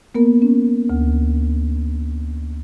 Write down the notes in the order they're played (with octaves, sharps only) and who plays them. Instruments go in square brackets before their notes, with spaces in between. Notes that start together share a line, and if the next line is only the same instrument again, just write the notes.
[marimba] A#3 B3 A#4
C#4
D2